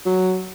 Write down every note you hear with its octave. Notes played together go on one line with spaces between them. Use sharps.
F#3